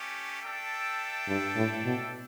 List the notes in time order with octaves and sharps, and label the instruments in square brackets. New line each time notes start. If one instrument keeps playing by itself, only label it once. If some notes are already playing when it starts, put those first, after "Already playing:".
Already playing: [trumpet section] A3 C#4 G4
D4 A4 E5 G5
[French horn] G2
A2
B2